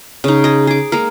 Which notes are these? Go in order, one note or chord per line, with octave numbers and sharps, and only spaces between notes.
C#3 D#4
G#4 D#5
G#4 D6
G#3 A#3 A#4